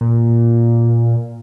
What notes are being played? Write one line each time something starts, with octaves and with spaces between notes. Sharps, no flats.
A#2